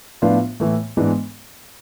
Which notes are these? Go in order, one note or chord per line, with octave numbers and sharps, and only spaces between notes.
A2 F3 B3 D4 F4
A2 E3 A3
G#2 E3 G#3 B3 D4